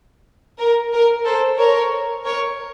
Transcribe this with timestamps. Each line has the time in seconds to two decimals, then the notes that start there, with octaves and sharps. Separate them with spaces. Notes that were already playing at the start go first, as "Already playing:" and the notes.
0.59 A#4
0.93 A#4
1.25 A4 C5
1.58 A#4 C#5
2.25 A#4 C#5